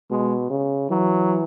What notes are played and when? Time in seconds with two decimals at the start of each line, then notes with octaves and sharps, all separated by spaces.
0.10 B2 G#3
0.50 C#3
0.90 E3 F#3